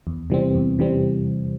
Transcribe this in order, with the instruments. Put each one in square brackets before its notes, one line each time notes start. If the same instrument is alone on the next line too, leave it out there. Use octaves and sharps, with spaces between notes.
[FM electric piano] E2
C3 E3 G3 C4
E2
C3 E3 G3 C4